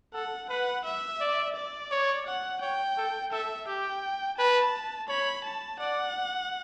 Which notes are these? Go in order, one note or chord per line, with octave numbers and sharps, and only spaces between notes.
A4 F#5
B4 F#5
E5
D5
D5
C#5
F#5
C#5 G5
A4
A4 E5
G4 G5
B4 A5
C#5 B5
A5
D5 F#5